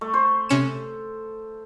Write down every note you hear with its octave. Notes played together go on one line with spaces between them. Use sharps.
A3
C5
C3 C#4 E7